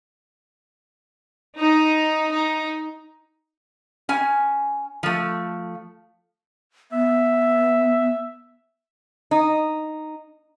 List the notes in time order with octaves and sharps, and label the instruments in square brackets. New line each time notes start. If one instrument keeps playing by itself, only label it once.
[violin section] D#4
D#4
[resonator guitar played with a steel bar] C#4 G#5
F3 A3
[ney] B3 [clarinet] E5
[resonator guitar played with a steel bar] D#4